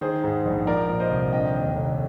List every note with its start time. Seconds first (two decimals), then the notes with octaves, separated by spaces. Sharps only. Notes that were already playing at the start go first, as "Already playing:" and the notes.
0.01 D#3 G#4 C5
0.24 G#2
0.45 A#1
0.67 F3 A#4 D5
0.89 A#2
1.00 C5 D#5
1.11 C2
1.33 D3 D#5 G5
1.55 D#2
1.76 F1